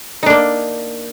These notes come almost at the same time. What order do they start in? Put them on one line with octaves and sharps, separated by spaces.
D#4 D4 A#3